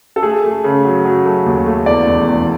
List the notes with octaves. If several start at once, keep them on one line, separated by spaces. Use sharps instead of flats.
A4
A3 G#4
A3
C#3
F#3
F#3
A3
D#2
A3
E2 D5
E1
E2